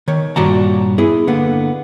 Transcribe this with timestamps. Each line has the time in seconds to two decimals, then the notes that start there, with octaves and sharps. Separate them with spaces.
0.08 D#3 C#5
0.36 G2 A#2 F#4 D5 A5 A#5
0.98 B3 E4 G#4
1.27 D3 A#3 B3